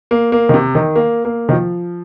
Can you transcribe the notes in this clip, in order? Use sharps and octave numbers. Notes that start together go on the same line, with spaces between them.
A#3
A#3
D#3
C3
D#3
A#3
A#3
D#3
F3